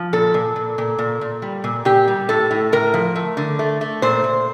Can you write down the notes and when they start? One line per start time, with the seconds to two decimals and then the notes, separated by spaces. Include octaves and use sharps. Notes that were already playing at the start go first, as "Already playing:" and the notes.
Already playing: F3
0.13 A#2 A4
0.34 A#2
0.56 A#2
0.78 A#2
0.99 A#2
1.21 A#2
1.42 G3
1.64 A#2
1.85 A#2 G4
2.08 G3
2.29 A2 A4
2.51 A2
2.72 A2 A#4
2.94 F3
3.15 A3
3.37 D3
3.59 A3
3.81 A3
4.02 A#2 C5
4.24 A#2